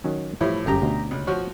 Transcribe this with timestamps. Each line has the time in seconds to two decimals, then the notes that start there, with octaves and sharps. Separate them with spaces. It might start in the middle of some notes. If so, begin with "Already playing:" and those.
0.04 D#3 F#3 C#4
0.41 A2 E3 F3 G3 E4
0.66 G1 F#2 C#3 G4 A#5
0.82 D2 B2
1.11 C#2
1.27 F3 F#4 C#5